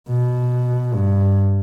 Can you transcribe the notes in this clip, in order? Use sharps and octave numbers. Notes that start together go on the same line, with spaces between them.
B2
G2